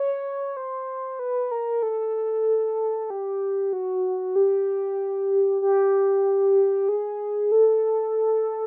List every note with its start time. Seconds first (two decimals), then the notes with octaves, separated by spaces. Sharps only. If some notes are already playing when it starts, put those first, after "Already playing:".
Already playing: C#5
0.57 C5
1.19 B4
1.51 A#4
1.83 A4
3.10 G4
3.73 F#4
4.36 G4
5.62 G4
6.89 G#4
7.52 A4